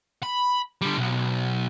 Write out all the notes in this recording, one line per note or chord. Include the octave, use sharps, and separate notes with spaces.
B5
D3 G3
B1